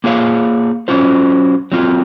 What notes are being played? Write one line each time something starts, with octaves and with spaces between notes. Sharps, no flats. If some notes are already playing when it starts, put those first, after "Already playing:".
A#3 F4 G#4 C#5 F5
F#3 C#4 F4 C5
F#3 C4 F4